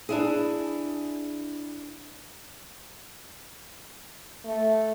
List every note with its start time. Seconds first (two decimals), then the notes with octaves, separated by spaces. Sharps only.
0.09 D4 E4 G#4
4.45 A3